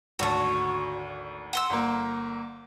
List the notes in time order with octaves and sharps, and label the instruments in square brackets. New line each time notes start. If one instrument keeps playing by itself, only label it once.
[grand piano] G#1 D2 A5 [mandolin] F#4 C#5
[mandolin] F#5 C6 E6
[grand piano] G1 A#3